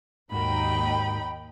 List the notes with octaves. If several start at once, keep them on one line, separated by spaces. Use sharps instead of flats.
D#2 G#2 D#4 F#4 A#4 G5 B5